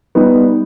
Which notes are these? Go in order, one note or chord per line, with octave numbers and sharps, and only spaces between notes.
G3 B3 D#4